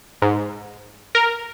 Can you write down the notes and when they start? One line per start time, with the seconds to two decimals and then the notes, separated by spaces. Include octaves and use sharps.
0.22 G#2
1.15 A#4